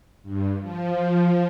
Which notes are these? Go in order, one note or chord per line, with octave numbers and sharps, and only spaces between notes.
G2
F3